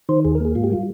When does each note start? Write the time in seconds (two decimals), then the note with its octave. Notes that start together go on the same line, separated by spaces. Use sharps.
0.09 D#3 C5
0.24 D#2 G#4
0.35 A#4
0.40 A#3 G#4
0.55 G#2 F4
0.64 G4
0.71 G3 F4